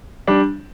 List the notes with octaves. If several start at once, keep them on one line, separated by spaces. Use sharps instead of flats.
G3 D4